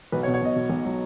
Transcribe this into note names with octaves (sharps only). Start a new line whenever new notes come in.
B1 B4
C#5
B2
C#5
B2 D#5
B2
B1
F#3